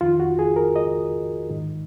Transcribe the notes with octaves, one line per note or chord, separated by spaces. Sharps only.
F2 D#3 F4
F#4
G#4
A#4
D#5
G#2 D#3